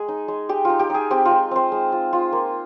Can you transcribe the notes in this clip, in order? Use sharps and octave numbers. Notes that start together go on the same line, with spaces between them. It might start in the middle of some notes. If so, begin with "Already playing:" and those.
Already playing: G#3 G#4
D#4
G#3
G#3 G4
D#4 F4
G4
D#4 G#4
C4 G4
F4
G#3
C4 C5
G#3
F4
F4
A#3